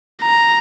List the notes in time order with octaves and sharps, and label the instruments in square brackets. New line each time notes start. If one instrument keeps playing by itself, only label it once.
[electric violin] A#5